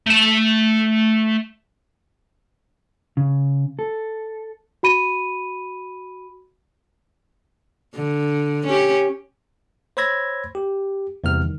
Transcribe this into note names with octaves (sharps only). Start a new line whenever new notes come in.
A3 A5
C#3
A4
F#4 B5 D#7
D3
C#4 G4
C5 C#5 B5 E6 G#6 A#6
G4
E2 C3 E3 G3 F6
D#3